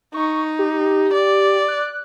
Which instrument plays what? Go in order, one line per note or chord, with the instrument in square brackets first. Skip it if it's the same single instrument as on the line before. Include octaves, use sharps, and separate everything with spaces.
[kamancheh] D#4 [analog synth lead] C#6
[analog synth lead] G4
[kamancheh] D5
[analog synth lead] F#6